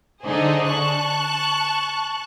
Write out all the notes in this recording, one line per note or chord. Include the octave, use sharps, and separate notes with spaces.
D3 D#4 G#4 C5
A5 C#6 F#6